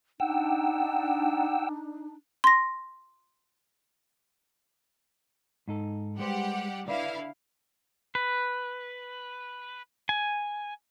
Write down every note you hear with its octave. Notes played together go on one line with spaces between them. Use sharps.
D4 D#4 F#5 G5 E6
C6 A#6
G#2 D#4 A4
G3 G#3 G4 B4 C5 F#5
D3 E4 B4 D5 F5
B4
G#5